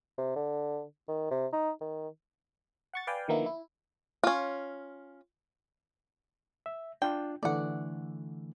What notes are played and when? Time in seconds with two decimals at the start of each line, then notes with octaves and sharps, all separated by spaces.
0.18 C3
0.36 D3
1.08 D#3
1.31 C3
1.53 D#4
1.81 D#3
2.93 F#5 C#6 A6
3.07 B4 D5 F5 G5 G#5
3.28 D3 D#3 F3 A#3 B3 E4
3.46 E4
4.24 C#4 F4
6.66 E5
7.02 D4 F4 G5
7.43 D3 E3 A3 D5 F#5